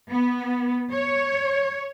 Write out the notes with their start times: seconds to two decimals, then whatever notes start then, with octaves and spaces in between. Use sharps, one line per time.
0.10 B3
0.91 C#5